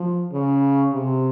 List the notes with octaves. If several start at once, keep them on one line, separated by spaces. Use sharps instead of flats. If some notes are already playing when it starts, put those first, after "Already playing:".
Already playing: F3
C#3
C3